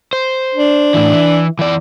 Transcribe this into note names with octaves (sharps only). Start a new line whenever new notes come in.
C5
D4
A2 E3
E3
E3 D5